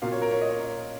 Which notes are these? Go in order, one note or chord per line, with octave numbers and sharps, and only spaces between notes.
A#2 F#3 A#3 F5
C#5
A#4
C#5
D#5
C#5
D#5